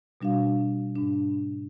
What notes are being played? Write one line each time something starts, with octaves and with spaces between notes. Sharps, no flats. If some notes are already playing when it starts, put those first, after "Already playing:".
B2 G3 D4 F#4 F5
G#2 D4